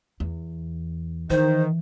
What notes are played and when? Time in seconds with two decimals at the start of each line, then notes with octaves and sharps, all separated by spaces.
0.20 E2
1.30 D#3 E3 C5